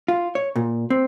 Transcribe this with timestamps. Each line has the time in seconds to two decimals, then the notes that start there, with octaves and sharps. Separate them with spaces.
0.08 F4
0.35 C#5
0.56 A#2
0.90 C4